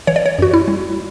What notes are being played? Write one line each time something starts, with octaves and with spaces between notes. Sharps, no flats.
E3 C#5
D5
C#5
F#2 F#4
E4
G3